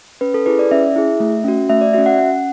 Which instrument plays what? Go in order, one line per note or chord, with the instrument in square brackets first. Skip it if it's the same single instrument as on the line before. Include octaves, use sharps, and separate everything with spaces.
[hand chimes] C#4 B4
A4
E4 G#4 B4
D5
C#4 E5
E4 G#4
A3
C#4 F#4
A3 E5
D5
C#4 F#4 E5
F#5
C#4 F#5